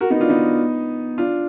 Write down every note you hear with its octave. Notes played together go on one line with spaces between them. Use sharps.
F#4 A#4
B3 D#4
D4 F4
B3 D#4
D4 F4